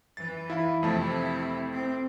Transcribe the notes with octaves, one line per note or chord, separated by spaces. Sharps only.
E3 A6
E4 F5 B5
F2 C3 A3 E4 A5
C4